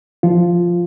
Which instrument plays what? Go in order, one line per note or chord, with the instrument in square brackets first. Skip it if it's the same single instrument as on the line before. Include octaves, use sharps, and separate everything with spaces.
[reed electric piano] F3 F4